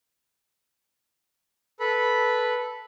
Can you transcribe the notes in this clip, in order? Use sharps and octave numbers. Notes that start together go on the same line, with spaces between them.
A4 B4 B5